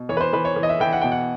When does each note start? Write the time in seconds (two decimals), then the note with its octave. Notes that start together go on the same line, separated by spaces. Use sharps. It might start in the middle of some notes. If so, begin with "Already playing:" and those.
Already playing: B2
0.09 E3 C#5
0.17 B4
0.21 C5
0.33 E3 B4
0.45 C#5
0.56 E3
0.63 D#5
0.69 E5
0.80 E3 G5
0.93 F#5
1.02 B2 G5
1.12 F#5